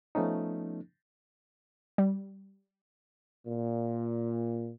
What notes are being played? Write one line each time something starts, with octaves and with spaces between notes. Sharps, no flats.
F3 A3 B3 C#4 D#4
G3
A#2